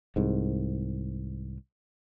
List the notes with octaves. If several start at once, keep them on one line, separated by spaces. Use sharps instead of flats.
C2 G#2